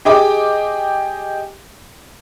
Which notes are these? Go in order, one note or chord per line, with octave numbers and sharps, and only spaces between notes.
G4 G#4 D#5 G5 D6